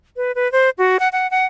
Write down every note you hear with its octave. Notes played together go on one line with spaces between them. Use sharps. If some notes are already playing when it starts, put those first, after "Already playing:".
B4
B4
C5
F#4
F#5
F#5
F#5